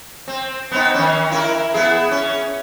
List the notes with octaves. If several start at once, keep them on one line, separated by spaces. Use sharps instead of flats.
C4
B3 C4 D#4
D#3 C#4
E4 A#4
B3 E4 G#4
C#4